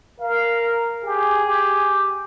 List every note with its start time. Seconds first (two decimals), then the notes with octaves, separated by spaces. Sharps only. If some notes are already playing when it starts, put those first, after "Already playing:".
0.20 A#4 F5
1.05 G4 G#4
1.45 G4